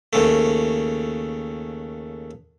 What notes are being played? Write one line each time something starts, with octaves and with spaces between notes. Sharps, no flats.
D#2 C#3 A3